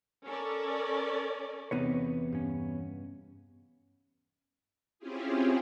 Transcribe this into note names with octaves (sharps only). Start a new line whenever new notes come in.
C#4 A4 A#4 D5
E2 C3 B3 D#4 B4 C#5
G2 C#4
C4 C#4 E4 F4 G4 G#4